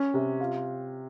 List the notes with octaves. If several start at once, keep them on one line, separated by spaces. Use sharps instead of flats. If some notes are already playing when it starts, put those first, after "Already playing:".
Already playing: C#4
C3
F4